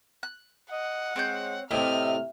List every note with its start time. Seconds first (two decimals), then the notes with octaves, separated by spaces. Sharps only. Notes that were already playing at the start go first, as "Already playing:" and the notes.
0.23 F#6
0.71 D#5 F#5
1.16 G#3 C4 C#5 G6
1.71 A2 C3 E4 D#5 F6